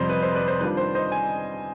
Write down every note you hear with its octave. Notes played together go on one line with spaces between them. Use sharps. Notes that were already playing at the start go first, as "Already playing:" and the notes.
Already playing: F2 C3 G3 C5 D#5
B4
C5
B4 D5
C5
D#3 G3 D4 F4 B4
C5
C5 D#5
G#5